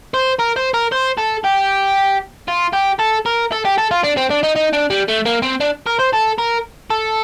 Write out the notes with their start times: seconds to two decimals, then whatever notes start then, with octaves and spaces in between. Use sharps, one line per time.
0.14 C5
0.40 A#4
0.56 C5
0.74 A#4
0.92 C5
1.18 A4
1.44 G4
2.48 F4
2.73 G4
3.00 A4
3.26 A#4
3.52 A4
3.65 G4
3.78 A4
3.91 F4
4.03 D4
4.17 C4
4.31 D4
4.44 D#4
4.56 D#4
4.73 D4
4.90 G3
5.08 A3
5.26 A#3
5.42 C4
5.60 D4
5.86 A#4
5.99 C5
6.13 A4
6.38 A#4
6.90 A4